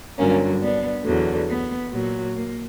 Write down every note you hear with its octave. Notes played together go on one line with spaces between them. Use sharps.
G2 D3 F#3 A#3 C#4
B3 D4
E2 D3 F#3
B3
A#2 F#3
A#3